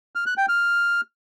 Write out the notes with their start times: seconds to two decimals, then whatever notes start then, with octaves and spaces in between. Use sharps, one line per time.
0.15 F6
0.26 F#6
0.37 G5
0.49 F6